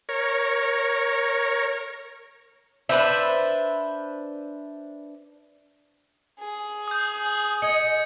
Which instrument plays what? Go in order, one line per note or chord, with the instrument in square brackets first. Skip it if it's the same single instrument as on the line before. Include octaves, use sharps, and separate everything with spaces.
[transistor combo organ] A#4 C#5
[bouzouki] D4 B4 C5 E5
[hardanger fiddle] G#4
[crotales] D#6 G6
[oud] D#5 [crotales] G#6 C#7